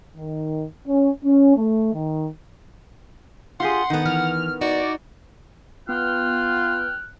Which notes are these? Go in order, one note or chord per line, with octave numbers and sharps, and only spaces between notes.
D#3
C#4
C#4
A3
D#3
F4 G4 G#4 F#5 C6
D2 D#3 B3 A4
E3 F6
D#4 F#4 D5
B3 F4 G5 F6 F#6